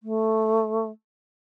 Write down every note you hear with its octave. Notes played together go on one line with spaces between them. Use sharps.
A3